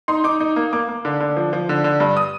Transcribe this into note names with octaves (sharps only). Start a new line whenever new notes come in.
D#4 C6
D#4 D6
D#4
A#3
A#3 D6
A#3
D3
D3
F3
F3
D3
D3
G2
D#6